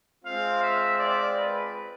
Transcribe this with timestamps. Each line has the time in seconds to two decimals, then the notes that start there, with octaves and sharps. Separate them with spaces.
0.24 G#3 C4 F4 F5
0.62 E5
0.99 D5
1.37 B4